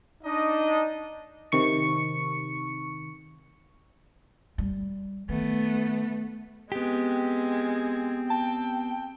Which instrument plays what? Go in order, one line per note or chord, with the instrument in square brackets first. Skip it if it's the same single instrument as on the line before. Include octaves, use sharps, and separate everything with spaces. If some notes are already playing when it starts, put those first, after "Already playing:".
[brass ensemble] D4 D#4 D#5
[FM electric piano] C3 D#3 C#6 C#7
[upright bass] G3
[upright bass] D#3 [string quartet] A3 B3
[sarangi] G#3 [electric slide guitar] B3 G4 [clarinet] C4
[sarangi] G5 [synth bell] A5